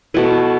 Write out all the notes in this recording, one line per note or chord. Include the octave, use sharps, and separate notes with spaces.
B2 A3 E4 B4